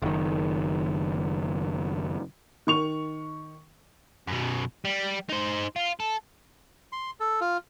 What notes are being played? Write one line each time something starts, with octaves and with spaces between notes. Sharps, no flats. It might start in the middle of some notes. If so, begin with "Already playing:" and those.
F#1 D#3
D#3 C#6 F7
F#2 B2
G3
D#4 C5
F4
A4
C6
A4
F4